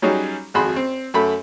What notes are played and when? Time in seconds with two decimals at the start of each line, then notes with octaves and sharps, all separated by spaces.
0.02 F#3 G3 C#4 D#4 F#4 G#4
0.54 G#1 F2 F#4 G#4 B5 C6
0.76 C4
1.14 F#2 A3 B5